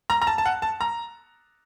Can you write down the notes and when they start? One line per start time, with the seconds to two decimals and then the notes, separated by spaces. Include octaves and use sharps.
0.10 A#5
0.22 A#5
0.27 A5
0.38 A5
0.46 F#5
0.62 A5
0.81 A#5